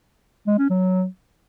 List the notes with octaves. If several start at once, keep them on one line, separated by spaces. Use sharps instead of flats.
G#3
C#4
F#3